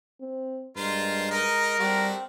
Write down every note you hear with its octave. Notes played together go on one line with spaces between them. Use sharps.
C4
G2 G#3 F4 A#4 C5
D#4 A#4 D#5
G3 A3 C4 D4 F#4